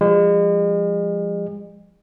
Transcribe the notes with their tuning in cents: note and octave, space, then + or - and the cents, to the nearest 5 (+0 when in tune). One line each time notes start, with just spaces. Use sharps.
F3 +0 G#3 -40